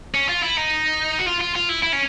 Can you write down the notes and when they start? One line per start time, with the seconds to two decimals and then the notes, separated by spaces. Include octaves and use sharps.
0.14 C#4
0.29 F4
0.43 E4
0.57 D#4
1.19 F#4
1.27 F4
1.41 F4
1.55 F4
1.69 E4
1.83 E4
1.93 C#4